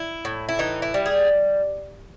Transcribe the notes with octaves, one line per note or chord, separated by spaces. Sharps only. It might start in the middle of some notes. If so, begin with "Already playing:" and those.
Already playing: E4
A2
E4
E3 D#4
E4
G3
G#4